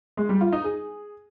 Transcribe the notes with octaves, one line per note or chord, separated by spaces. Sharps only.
G#3
G3
F4
D#4
G#4